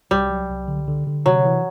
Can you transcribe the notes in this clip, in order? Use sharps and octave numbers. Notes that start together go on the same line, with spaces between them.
C2 G3
F#3
C2
D3
D3
D3
C3 F#3
E3